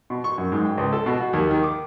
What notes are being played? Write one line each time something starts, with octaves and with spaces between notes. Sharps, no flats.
B2
C#6
F#2
G#2
G5
C#2
A4
B2
F#4
D#2
D#3
D6